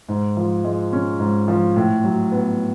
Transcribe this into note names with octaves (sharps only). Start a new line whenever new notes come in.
G#2
F3
G#3
C#4
G#2
F3
A2
F#3
B3